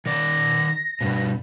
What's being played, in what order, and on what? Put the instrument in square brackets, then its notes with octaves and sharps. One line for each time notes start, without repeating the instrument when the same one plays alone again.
[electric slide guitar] D#3 D5 [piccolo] A#6
[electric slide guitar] G2 B2